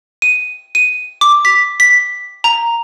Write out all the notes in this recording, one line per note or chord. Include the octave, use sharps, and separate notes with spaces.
D#7
D#7
D6
B6
B6
A#5